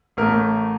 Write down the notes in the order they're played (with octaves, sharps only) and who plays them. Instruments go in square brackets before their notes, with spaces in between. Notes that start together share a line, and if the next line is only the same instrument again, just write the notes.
[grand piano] A1 A2 A3 A#4